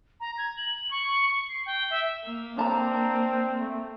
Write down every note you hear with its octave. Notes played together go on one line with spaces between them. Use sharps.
A#5
G#6
F#7
C#6
C7
G5
E5
A#3
C4 D4 A5 A#5
A3